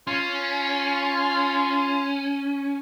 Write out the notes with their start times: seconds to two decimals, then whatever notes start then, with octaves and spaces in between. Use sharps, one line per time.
0.07 C#4 F4